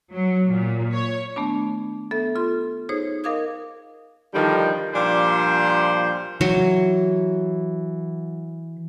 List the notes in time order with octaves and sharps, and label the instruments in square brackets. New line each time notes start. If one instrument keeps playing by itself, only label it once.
[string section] F#3
A#2
C#5
[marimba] D#3 A3 B3 D4
B3 A4 E5
F4 C6
D#4 G#4 C5 C#5
A#4 D#5 F5 D6 D#6 G#6
[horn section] D3 D#3 F3 G3
A#2 F3 G3 D4 C5
[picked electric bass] E3 [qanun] F#3